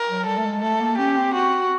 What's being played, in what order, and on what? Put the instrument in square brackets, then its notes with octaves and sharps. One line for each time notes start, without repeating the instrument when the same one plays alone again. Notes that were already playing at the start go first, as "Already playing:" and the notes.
Already playing: [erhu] A#4
[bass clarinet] F#3
[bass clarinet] G3 [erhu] A4
[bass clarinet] A3
G#3
[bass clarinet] A3 [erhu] A4
[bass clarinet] A#3
[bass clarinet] C#4 [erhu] G4
[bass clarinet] C4
[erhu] F#4